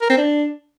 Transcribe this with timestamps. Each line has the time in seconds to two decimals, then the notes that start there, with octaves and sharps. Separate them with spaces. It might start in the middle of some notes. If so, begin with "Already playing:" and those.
0.02 A#4
0.10 C4
0.18 D4